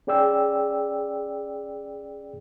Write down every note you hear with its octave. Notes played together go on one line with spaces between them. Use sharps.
C#4 G#4 D5 G5 E6